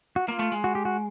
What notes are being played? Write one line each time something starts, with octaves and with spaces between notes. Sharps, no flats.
F#4
A#3 F4
A3
G#3
F#4
G4
F#4